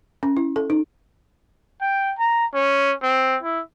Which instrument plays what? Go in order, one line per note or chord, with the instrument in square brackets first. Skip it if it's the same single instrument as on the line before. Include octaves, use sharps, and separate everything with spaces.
[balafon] C#4
E4
A4
D#4
[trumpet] G5
A#5
C#4
C4
E4